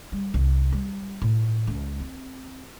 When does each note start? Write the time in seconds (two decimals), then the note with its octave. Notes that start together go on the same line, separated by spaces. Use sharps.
0.12 G3
0.34 C2
0.72 G3
1.22 A2
1.67 C#2
2.00 C4